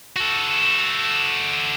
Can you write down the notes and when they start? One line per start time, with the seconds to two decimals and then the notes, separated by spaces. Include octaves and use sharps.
0.16 F#4 A4